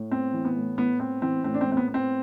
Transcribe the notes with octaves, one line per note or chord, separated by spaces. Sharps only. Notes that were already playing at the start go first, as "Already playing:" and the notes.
Already playing: A2
B3 C4
E3
B3
A2
A2 B3
B3 C4
E3 C4
A2 C4
D4
C4
A2
C4
B3
B3
C4